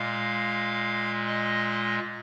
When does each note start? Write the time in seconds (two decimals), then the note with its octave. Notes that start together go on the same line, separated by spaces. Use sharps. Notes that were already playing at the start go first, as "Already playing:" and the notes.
Already playing: A#2 G#3 F5
1.27 D#5